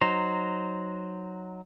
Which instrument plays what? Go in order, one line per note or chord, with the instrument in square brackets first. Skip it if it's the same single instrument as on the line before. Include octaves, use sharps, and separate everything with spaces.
[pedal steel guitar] F#3 D#4 C5